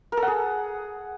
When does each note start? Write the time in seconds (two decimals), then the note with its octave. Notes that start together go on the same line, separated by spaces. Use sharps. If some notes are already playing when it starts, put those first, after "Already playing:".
0.12 A#4
0.17 A4
0.22 F#5
0.27 G#4